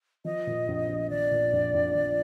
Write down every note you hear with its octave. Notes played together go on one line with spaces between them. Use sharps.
F3 D#5
A#2
A#1
A#1
F3 D5
A#2
A#1
A#1
F3